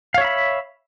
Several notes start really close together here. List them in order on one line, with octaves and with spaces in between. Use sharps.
F5 C#5 E5 B5